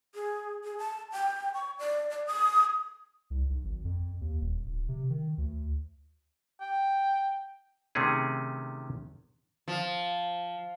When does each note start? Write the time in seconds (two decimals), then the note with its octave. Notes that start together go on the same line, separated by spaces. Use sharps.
0.15 G#4
0.64 G#4
0.78 A5
1.12 G5
1.54 C#6
1.79 D5
2.10 D5
2.27 D#6
3.30 C2
3.49 B1
3.64 G#1
3.85 F2
4.21 D#2
4.41 D#1
4.66 D1
4.88 C3
5.10 D#3
5.38 D2
6.61 G5
7.95 C3 D#3 A3 B3 C#4 G#4
9.68 F3